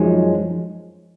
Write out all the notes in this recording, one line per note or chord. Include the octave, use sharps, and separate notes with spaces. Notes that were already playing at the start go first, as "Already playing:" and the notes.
Already playing: F#2 F3 G#3 D#4 G#4